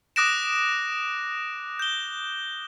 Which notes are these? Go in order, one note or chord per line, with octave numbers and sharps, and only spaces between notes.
D6 D#6 F#6 A#6 D7 E7
G6 G7